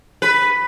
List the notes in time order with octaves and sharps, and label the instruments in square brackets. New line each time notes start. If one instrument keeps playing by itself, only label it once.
[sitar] B4